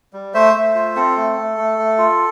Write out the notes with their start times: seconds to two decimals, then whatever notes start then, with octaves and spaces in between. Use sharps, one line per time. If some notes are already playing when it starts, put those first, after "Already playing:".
0.13 G3
0.34 A3 C5 E5
0.54 A3
0.75 F4
0.96 C4 A4
1.16 A3
1.37 A3
1.58 A3
1.78 A3
1.98 F4